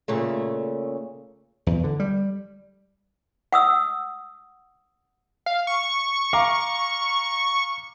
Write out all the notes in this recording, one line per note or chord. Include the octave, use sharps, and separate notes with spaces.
A#2 C#3 A3
E2
D3
G3
F#5 D#6 E6
F5
C#6
F5 A#5 D6